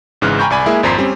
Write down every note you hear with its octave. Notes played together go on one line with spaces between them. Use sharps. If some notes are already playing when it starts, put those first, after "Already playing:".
G#1 G#2 C#3 E3 F6 F#6
G5 G#5 A#5 B5 C#6 G6
C2 D5 G#5 B5
G#3 A#3 E4 G#4 E5
G#1 F2 C5 A#5 B6 C7
G3 C4 C#4